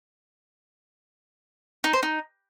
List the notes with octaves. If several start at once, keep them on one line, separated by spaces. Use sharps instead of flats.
D#4
C5
D#4